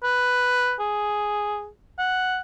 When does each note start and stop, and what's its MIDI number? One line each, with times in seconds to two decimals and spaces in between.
0.03 0.74 71
0.80 1.68 68
1.98 2.40 78